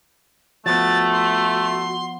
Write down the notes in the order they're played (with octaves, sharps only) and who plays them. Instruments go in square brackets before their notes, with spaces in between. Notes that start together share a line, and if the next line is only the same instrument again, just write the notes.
[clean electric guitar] F3 B3 [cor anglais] A3 [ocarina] F#4 [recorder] A6
[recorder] C6